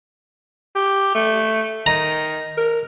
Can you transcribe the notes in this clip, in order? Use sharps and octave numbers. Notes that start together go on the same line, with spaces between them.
G4
A3
D#3 A#5
A#4